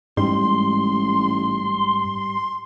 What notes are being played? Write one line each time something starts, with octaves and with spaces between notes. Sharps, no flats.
A1 G#2 G3 C6